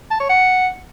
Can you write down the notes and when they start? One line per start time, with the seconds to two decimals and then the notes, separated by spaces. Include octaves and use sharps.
0.11 A5
0.20 C#5
0.29 F#5